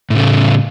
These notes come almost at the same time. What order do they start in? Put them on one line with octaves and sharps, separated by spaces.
A2 C#3 A3